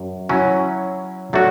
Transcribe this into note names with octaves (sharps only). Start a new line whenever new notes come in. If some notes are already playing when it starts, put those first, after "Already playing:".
Already playing: F#2
F#3 C#4 E4
F#3 A3 D4 F#4